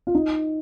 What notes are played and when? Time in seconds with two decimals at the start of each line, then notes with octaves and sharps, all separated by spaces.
0.07 F4
0.15 D#4